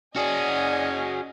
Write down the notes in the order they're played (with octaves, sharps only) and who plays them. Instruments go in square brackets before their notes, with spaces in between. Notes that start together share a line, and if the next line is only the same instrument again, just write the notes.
[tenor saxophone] C#4 [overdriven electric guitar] F#4 G#4 [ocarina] D5 [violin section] D#5 G#5